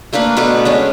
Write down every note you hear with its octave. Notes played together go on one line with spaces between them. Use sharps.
A3 A#3 D4 B4
B2 A3 B4 D6
G#3 C#4 D4